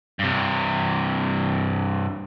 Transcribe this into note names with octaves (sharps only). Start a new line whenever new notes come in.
G2 C3